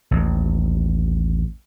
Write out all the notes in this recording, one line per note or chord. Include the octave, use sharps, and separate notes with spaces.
A1 D#2